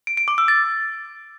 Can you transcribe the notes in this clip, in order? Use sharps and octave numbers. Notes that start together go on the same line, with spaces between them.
D7
D7
D6
E6
A6